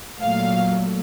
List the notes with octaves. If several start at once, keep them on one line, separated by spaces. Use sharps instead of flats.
A#2 F#3 A3 F5